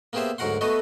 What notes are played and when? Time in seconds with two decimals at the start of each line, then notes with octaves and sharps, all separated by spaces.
0.13 A#3 B3 G4 G#4 C5 E5
0.38 D2 G#2 F#3 A#4 F#5 C6
0.61 A3 B3 F#4 A4 B4 D#5